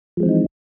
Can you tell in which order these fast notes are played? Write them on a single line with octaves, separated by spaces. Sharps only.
F3 G#3 C4 E3 D#4